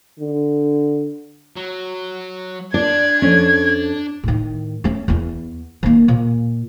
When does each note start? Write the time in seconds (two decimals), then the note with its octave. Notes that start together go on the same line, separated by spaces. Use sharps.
0.19 D3
1.56 F#3
2.74 D4 D5 G#6
3.22 F2 C#4
4.24 A2 D#3
4.84 A3 C#4
5.08 E2 B3
5.83 D#3 A#3
6.08 A#2